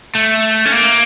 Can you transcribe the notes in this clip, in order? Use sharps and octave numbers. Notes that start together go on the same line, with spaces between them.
A3
C#4
A#3